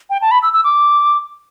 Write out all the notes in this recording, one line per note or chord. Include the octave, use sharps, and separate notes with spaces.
G5
A5
B5
E6
E6
D6